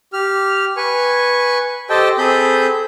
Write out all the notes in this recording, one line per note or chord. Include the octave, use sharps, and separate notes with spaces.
G4 F6
B4 G#5 C#6
G4 A4 C5 D#5 G5 A5
C4 G#4 A4 B5 G6